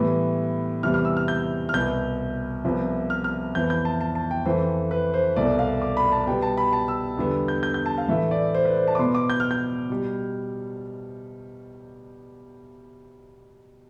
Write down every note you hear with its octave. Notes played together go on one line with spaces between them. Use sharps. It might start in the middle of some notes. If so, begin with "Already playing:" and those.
Already playing: A2 E3 G3 B3
E2 C3 E3 G3 F6
F6
E6
F6
G6
F6
C2 B2 B3 G6
C2 C3 F3 B3
F6
F6
F2 E3 B3 G6
G6
A5
A5
A5
G5
F2 E3 A3 C5
B4
C5
C2 B2 A3 D5
F5
D6
B5
A5
B2 G3 B3 G5
A5
B5
A5
E6
E2 D3 G3 B3
G6
G6
G6
A5
F5
A2 E3 A3 E5
D5
C5
B4
C5
A5
D6
B2 B3 C6
D6
G6
F6
G6
B2 G3